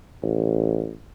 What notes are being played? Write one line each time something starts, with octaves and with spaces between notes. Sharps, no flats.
A1